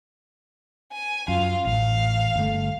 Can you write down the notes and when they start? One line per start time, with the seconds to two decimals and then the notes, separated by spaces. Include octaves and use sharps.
0.92 G#5
1.28 F#2 F4 F5
1.66 A1 F5
2.36 G1 A3